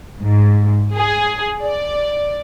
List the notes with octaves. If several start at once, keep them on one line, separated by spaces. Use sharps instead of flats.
G#2
G#4
D5